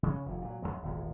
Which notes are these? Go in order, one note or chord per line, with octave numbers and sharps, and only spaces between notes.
C#3 C#4
F1 D2
A#2 F#3
A1 D3 F#3 G#3
D#1 G#1 E2 A2